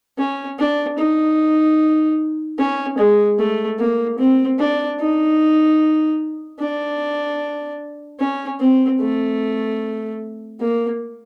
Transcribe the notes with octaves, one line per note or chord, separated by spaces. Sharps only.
C#4
D4
D#4
C#4
G#3
A3
A#3
C4
D4
D#4
D4
C#4
C4
A3
A#3